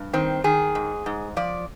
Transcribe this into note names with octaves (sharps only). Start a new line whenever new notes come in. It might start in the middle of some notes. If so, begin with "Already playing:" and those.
Already playing: G2
D#3 C4
D#3 G#4
G#2
G#2
F3 D5